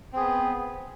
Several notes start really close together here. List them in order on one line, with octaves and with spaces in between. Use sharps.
C4 G#4 B3